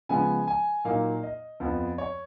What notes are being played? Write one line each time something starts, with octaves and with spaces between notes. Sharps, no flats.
C#3 F3 G#3 B3 G#5
G#5
A#2 F#3 A#3 D#4 F5
D#5
F2 F3 B3
C#5